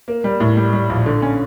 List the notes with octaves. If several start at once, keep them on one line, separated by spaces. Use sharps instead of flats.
A#3
G3
A2
G3
G3
A#1
D3
C#4